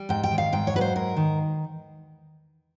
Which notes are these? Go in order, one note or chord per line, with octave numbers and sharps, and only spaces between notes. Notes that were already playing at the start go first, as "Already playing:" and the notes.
Already playing: G3
G#2 G5
G5
D#3
F5
G#2 G5
C#5
F#3 B4
C5
G#2 A#4
D#3